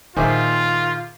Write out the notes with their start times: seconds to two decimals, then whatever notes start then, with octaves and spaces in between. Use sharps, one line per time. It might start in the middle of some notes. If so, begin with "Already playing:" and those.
0.16 A#2 D#3 E4 F4 G#4 C5 E5 D6